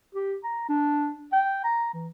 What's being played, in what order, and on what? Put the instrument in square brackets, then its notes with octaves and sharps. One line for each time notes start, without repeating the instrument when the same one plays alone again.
[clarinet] G4
A#5
D4
G5
A#5
E3